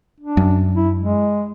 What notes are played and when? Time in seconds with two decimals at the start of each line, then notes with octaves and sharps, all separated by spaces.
0.20 D4
0.37 F#2
0.75 E4
0.99 G#3